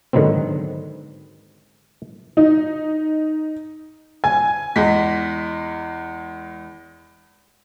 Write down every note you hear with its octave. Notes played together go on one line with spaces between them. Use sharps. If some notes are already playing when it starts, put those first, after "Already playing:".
G#2 D3 D#3 F#3 B3 C4
D#4
G#5
E2 G#3 B6